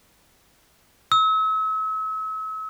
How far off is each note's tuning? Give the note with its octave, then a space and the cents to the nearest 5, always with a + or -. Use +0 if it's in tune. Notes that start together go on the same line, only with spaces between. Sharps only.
E6 -40